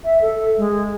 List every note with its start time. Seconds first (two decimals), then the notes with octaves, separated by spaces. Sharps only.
0.04 E5
0.22 A4
0.57 G#3